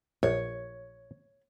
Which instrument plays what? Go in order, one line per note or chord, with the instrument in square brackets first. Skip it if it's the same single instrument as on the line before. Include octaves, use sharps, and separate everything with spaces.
[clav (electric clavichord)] A#1 [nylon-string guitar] C#5